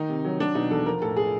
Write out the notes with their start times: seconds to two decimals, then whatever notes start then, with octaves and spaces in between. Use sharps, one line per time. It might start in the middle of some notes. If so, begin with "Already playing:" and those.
Already playing: D#3 D#4
0.09 C3
0.25 F#3
0.40 F#3 D4
0.55 B2 D#4
0.70 E2 A4
0.86 F3 A#4
1.02 A2 A4
1.17 G#4